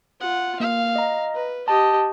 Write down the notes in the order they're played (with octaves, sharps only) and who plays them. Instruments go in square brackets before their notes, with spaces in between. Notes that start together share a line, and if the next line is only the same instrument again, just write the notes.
[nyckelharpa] F4 F#5
[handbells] A#3 [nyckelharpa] F5
[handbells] D#5 A#5
[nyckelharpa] B4
[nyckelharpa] G4 D#5 [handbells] A5